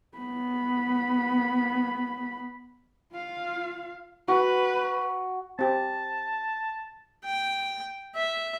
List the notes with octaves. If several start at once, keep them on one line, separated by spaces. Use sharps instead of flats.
B3 B5
F4 F5
F#4 B4
C4 G4 A5
G5
E5